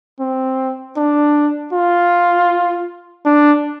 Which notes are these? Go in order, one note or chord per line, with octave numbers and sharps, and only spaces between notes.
C4
D4
F4
D4